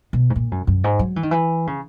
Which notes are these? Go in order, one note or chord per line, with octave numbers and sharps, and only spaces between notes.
B2
G#2
A#2
F#2
F#2
G#2
F#3
E3
D#3
E3
C#3